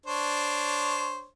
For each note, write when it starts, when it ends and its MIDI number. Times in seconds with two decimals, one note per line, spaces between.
0.06 1.27 62
0.06 1.27 72
0.06 1.27 73